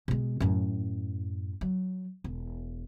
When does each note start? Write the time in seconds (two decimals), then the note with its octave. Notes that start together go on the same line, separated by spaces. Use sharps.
0.08 B2 G#3
0.40 F#2 A2
1.61 F#3
2.24 E1